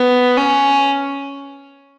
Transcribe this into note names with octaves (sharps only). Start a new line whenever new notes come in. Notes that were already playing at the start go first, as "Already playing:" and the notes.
Already playing: B3
C#4